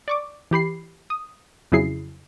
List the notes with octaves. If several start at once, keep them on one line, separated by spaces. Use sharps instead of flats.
D5 C#6 D6
E3 G4 B5 C7
D#6
F2 C#3 F#3 E4 G#4 C7